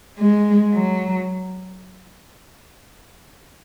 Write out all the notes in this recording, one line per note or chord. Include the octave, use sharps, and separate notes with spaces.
G#3
F#3